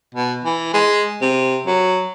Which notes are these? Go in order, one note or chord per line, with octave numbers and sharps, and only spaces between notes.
B2
E3
G#3
C3
F#3